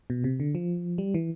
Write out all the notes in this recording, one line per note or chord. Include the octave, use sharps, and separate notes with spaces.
B2
C3
D3
F3
G3
E3